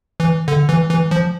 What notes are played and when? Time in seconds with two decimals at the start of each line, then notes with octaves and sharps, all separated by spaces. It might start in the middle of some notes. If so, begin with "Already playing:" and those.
0.20 E3
0.48 D3
0.69 E3
0.90 E3
1.11 F3